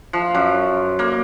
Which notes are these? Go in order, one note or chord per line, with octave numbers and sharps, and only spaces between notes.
F3
F#2
A#3